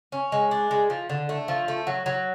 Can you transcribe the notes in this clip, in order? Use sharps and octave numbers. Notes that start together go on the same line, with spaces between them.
C#4
G#3
D4
G#3
F3
D3
A3
F3
A3
F#3
F#3